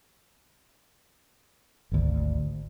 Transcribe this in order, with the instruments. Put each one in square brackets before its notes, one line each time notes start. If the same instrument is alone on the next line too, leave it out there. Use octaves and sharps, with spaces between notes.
[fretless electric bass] G#1 D2